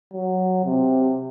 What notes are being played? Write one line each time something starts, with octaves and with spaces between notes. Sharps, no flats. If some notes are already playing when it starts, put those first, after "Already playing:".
F#3
C3